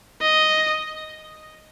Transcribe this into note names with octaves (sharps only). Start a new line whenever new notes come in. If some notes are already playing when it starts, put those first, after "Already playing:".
D#5